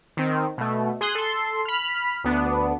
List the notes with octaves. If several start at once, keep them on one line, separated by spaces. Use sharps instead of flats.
D#3 C4
B2 A3
G#4 C6 D#6 F#6
A4 C6
B5 F6
D2 B3 D4